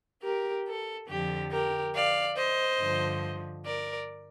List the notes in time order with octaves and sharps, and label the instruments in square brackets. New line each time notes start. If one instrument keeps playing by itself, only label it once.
[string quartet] G4 A#4
A4
F2 D3 F3 G4
G4 A#4
D5 F5
C5 D#5
G2 D3 F3
A#4 D5